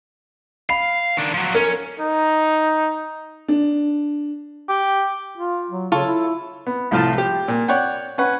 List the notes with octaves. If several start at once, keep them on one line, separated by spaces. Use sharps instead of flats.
F5 B5
D#3 D4
F3 F#3
C#4 A#4
D#4
D4
G4
F4
F#3
C#3 F4 A4 C#5
E4
B3
C2 A2 F3 F4 A5
G4
A#2
C#5 D5 F#5 G5
C#4 B4 F#5